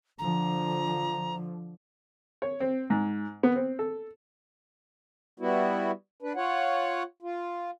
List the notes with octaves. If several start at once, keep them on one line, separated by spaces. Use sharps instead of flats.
D3 F3 A#5
C#5
C4
G#2
B3
C4
A4
G3 B3 E4 F#4
D4 B4
F4 C#5 F#5
F4